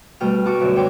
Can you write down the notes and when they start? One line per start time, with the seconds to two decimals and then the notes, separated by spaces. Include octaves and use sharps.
0.20 B2 G3 A3 F#4 G5 F6
0.45 F#4 A5 C#6 D6
0.60 F#2 B2 D3 E5
0.76 C#5 G5 C6 D6